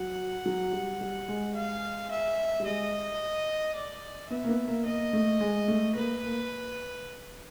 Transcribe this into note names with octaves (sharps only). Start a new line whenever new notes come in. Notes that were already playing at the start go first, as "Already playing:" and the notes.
Already playing: F#3 F#5
F#3
G3
G3
G#3
F5
E5
G3
G#3 D#5
D5
B3 E5
A#3
B3
A#3
A#3 D#5
A3
G#3
A3
A#3 B4
A#3